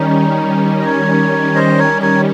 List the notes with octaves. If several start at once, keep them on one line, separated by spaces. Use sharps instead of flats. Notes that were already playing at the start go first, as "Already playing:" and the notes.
Already playing: D#3 G3 C#4 D#4
D#5
A#4 C#5
C5 D#5
A#4 C#5
A#4 C#5